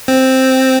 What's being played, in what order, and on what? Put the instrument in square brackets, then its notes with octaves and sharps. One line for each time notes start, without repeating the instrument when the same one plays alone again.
[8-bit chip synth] C4